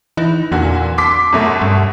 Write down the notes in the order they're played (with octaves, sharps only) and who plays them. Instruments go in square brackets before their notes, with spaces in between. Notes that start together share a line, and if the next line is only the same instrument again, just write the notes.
[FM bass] E3 [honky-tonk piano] D#4
[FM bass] E2 [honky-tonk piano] A#2 D3 F#4
[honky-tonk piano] C6 D6 B6
F#2 B2 A3
[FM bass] G2